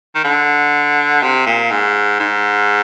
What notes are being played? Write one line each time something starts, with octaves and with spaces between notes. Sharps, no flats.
D#3
D3
C3
A#2
G#2
G#2